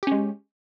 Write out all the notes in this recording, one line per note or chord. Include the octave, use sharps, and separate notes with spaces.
G#3 C#4 G4